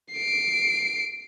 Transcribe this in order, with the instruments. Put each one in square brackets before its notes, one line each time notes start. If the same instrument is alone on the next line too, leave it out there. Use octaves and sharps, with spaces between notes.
[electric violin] C7 D7